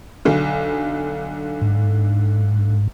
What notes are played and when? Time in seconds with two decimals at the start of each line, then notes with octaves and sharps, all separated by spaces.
0.25 B1 D3
1.62 G#2